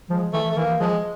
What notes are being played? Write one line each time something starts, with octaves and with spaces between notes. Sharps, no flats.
F3 G#3
E3 A3
A3
E3 A#3
F3 G#3